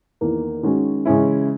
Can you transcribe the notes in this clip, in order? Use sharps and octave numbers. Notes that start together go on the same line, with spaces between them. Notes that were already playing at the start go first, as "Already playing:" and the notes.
E2 D#3 A#3
D#3 G#3 C#4 F#4
C#3 E3 G#3 C#4 E4